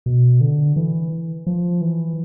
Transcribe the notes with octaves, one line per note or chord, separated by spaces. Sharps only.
B2
D3
E3
F3
E3